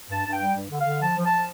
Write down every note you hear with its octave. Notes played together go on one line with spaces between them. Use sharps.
G2 A5
G2
G5
G3
G2
D3
F5
D3
F3 A5
F3
A5
F3